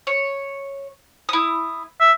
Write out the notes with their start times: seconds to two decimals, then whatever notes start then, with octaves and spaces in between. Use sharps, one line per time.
0.07 C#5
1.29 E4 D#6
2.00 E5